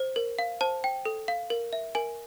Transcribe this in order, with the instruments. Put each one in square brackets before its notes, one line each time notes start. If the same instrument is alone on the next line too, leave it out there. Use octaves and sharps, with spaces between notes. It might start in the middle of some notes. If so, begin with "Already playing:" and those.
Already playing: [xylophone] C5
A#4
F5
C5 A5
G5
A4
F5
A#4
E5
A#4 G#5